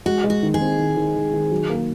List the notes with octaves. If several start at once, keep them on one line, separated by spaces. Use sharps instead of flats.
G#3 F#4
G#3
F#4
D#3
G#4
C4
D#3
D#3
D#3
D#3
F#3
A#3